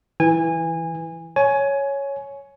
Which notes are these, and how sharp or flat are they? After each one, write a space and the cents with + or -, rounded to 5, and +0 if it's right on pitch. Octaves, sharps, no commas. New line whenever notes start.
E3 +0 G#5 -25
C#5 +0 G#5 +15